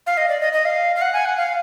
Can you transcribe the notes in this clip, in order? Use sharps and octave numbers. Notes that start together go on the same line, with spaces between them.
F5
D#5
D5
D#5
D#5
F5
F5
F#5
G#5
F#5
F5